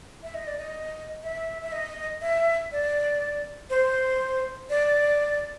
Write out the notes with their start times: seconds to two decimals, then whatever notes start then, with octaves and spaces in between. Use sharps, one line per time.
0.23 E5
0.34 D#5
0.47 D5
0.58 D#5
1.23 E5
1.62 E5
1.72 D#5
2.21 E5
2.72 D5
3.70 C5
4.70 D5